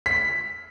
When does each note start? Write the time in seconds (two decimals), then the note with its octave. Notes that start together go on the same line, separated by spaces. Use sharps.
0.06 B6